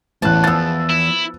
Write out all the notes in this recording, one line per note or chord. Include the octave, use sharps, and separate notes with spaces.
A1 E2 G#2 A5 F#6
F3 B3 E6 A6
E4